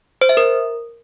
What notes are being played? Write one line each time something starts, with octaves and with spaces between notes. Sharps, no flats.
C5
E5
A#4